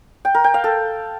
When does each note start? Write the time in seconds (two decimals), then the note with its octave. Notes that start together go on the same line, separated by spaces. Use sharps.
0.25 G5
0.35 A#4
0.44 G5
0.54 F5
0.64 A4